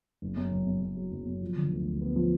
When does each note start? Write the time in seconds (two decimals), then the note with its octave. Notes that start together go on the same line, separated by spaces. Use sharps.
0.22 F#1
0.37 F#2
0.52 F#1
0.67 F#2
0.82 F#2
0.97 F#3
1.12 F#1
1.26 F#2
1.42 F3
1.56 D3
1.71 D2
1.86 D2
2.01 B3
2.16 F3